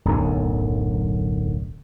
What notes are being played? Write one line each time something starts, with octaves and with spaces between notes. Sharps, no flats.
D1 B1 F#2 D3